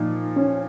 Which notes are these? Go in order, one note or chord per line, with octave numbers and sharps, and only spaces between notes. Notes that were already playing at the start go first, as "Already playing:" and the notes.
Already playing: A#2 F3 D#4
C#4